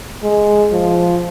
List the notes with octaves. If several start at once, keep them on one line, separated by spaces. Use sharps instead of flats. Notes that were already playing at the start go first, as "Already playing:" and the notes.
G#3
F3